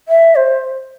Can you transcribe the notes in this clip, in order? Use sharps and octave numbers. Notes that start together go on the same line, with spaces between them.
E5
C5